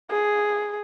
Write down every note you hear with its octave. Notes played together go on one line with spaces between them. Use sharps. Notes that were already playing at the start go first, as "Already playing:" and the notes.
G#4